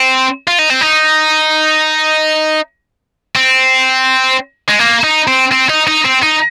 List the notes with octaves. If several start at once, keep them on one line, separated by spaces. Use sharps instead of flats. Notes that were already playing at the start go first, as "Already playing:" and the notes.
Already playing: C4
F4
D#4
C4
D#4
C4
G#3
A#3
D#4
C4
C4
D#4
D#4
C4
D#4